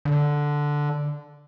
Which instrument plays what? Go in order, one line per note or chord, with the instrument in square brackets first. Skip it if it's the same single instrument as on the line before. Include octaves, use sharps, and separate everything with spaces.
[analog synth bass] D3